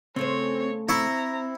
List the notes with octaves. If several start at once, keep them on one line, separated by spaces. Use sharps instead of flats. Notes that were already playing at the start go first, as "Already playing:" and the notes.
C#3 A3 C4 C5 C#5
C4 E4 A#5 C#6